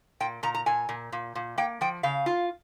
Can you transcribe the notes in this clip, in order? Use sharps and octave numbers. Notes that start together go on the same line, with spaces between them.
A#2 G5
A#2 A#5
A#5
A#2 G#5
A#2
A#2
A#2
A#3 G5
F3 G5
C#3 F5
F4